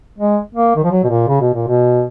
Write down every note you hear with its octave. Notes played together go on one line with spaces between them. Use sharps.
G#3
A#3
D#3
F3
F#3
B2
A#2
C#3
B2
A#2
B2